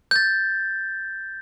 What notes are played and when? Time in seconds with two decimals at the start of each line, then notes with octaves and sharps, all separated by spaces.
0.11 G6 A6